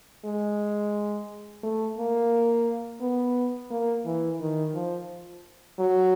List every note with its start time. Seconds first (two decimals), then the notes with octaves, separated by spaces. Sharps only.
0.25 G#3
1.63 A3
1.98 A#3
3.01 B3
3.71 A#3
4.06 E3
4.40 D#3
4.74 F3
5.79 F#3